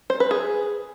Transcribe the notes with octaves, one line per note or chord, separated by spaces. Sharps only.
C5
B4
G#4